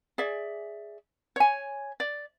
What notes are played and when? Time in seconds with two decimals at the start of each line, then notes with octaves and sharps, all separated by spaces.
0.18 G#4 D5 E5
1.36 C#5 G#5
2.00 D5